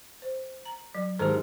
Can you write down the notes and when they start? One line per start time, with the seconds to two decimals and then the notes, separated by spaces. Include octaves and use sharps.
0.22 C5
0.66 A#5
0.95 F#3
1.19 G#2 D#3 G4 A4 A#4